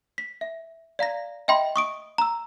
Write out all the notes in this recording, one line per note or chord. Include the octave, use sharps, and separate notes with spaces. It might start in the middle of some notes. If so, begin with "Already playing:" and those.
B6
E5
D5 F5 A#5 A#6
D#5 E5 G5 B5 C6
C#6 D#6 D7
A#5 E6